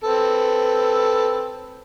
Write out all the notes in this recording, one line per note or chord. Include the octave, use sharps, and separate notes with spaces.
C4 A4 B4